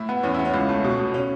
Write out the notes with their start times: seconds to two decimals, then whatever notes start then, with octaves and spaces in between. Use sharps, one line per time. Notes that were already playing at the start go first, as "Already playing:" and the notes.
Already playing: A2 E4
0.09 B3
0.23 E2 C#4
0.34 B3 E4
0.45 C#4
0.54 C#2
0.69 A3
0.84 B2
0.99 B2
1.14 C#4